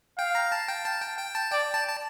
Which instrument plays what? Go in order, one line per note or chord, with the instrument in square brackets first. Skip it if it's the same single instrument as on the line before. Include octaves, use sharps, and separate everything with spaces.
[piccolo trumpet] F5 [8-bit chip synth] G5
[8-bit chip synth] A#5
A5
G5
A5
G5
G5
A5
[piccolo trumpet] D5 [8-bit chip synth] G5
[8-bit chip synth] A5
A5